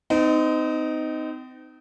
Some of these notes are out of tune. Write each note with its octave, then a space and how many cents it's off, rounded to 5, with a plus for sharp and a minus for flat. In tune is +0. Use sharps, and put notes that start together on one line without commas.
C4 -35 D#4 +0